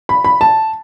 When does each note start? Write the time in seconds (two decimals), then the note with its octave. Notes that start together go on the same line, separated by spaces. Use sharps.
0.09 B5
0.24 B5
0.41 A5